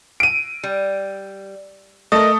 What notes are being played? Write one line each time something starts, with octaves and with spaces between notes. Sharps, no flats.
D7 D#7
G3
A3 A#4 D#5 D#6